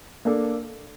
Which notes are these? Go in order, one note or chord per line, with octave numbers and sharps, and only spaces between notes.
A#3 D4 A4